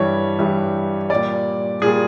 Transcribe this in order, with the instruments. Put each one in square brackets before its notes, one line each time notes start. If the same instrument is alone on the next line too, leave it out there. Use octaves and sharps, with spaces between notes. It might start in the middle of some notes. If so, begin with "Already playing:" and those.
Already playing: [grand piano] G2 E3 G3 C#5
G2 E3 G3
A#2 G3 D5
A#2 G3 G#4